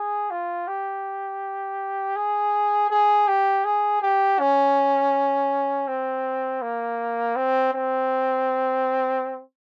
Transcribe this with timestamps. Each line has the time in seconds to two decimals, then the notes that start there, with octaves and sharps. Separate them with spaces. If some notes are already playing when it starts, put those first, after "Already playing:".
Already playing: G#4
0.31 F4
0.68 G4
2.16 G#4
2.90 G#4
3.28 G4
3.65 G#4
4.02 G4
4.39 C#4
5.87 C4
6.62 A#3
7.36 C4
7.74 C4